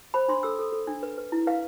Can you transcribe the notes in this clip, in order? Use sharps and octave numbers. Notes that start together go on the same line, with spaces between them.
C5 B5
D4 C6
A4 E6
A4
A4
D4
B4
B4
E4
B4 F5